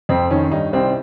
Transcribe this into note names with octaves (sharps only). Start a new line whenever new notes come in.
F2 C4
D#3 C#4
G2 D#4
C2 C4